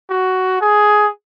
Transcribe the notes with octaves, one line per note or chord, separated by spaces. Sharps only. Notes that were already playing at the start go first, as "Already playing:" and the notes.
F#4
G#4